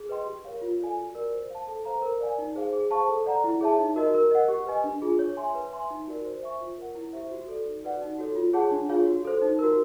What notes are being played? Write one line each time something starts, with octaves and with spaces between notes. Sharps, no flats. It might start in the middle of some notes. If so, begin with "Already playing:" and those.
Already playing: G#4
B4 D#5 G5 C6
G4
A#4 C#5 F5
F4
A4 D5 F5 G#5
F#4
A#4 D5
C5
F5 A5
A4
C5 F5 A#5
A#4
D5 F5 G#5
D#4
G#4 C5 F5
G#4
C5 F5 A5 C#6
A4
D5 F#5 A#5
E4
G#4 C#5 E5 A5
D#4
F#4 A#4 D#5
A#4
D#5 F#5
G4
B4 D#5 G#5
D4
F4 G#4
C#5
E5 G#5 C6
B4
E5 G#5 C6
D#4
F#4 A#4 D5
C5
E5 G#5 C#6
F4
A#4 C#5 F#5
E4
G4 C5 E5
F#4
A4 D5
D#4
F#4 B4 D5 F#5
D#4
F#4 A4 C#5
F4
G#4 C#5 F#5 A5
D4
F4 G#4 C#5 F5
F#4
A4 C5
D#4
F#4 A#4